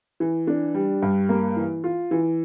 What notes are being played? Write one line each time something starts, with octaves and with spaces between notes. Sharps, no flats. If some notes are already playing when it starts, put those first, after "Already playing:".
E3
D4
G3
G2
A#3
E3
F4
E3